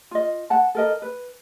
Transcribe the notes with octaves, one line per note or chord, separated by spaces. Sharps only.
F4 D#5
F#5 A5
A4 A#4 D#5
B4